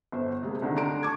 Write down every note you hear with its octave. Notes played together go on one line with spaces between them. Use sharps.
G1 C5
C3 G#3 A#3
C2 D3 D#3
A3 D4 A#5 C6 D7
A5 C#6 D6 G#6